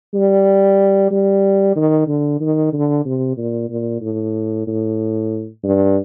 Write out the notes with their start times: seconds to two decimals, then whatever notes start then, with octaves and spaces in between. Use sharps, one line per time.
0.14 G3
1.11 G3
1.76 D#3
2.08 D3
2.40 D#3
2.73 D3
3.06 C3
3.37 A#2
3.69 A#2
4.02 A2
4.67 A2
5.64 G2